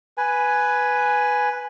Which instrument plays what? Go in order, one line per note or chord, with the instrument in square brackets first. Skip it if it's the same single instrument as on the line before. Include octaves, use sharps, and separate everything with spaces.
[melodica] B4 G#5